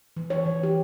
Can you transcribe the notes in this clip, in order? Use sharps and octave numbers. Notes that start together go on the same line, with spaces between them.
E3
C#5
E3
G4